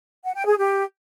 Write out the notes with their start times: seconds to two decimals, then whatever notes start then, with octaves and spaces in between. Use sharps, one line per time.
0.24 F#5
0.36 G5
0.47 G#4
0.59 G4